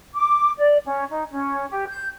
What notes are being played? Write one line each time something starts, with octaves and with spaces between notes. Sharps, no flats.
D6
D5
C#4
D#4
C#4
G4
G6